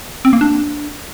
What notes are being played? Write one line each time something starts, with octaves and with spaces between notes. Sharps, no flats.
C4
A#3
D4